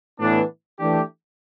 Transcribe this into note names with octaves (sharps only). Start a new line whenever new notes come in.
A2 E3 B3 D4
E3 A3 D4 G4